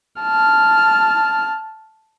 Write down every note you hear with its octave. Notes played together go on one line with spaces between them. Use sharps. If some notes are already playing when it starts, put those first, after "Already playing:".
A5 F6